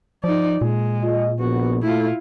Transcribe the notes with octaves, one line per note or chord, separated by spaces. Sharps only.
F3 D#4 D5
A#2 G#3
F4 D#5
A#1 B3 F#4
A3 E4 F4